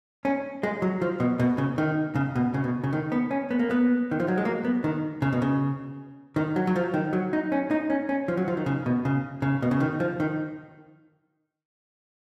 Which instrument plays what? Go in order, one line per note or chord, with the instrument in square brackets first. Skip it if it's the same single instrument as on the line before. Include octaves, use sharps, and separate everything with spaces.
[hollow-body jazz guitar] C#4
G#3
F#3
F3
B2
B2
C#3
D#3
C#3
B2
C#3
B2
C#3
D#3
B3
C#4
B3
A#3
B3
D#3
F3
F#3
G#3
A#3
B3
D#3
C#3
B2
C#3
D#3
F#3
F#3
F3
D#3
F#3
D#4
C#4
D#4
C#4
C#4
F3
F#3
F3
D#3
C#3
B2
C#3
C#3
B2
C#3
D#3
F3
D#3